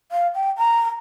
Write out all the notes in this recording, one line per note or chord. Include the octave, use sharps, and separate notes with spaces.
F5
G5
A#5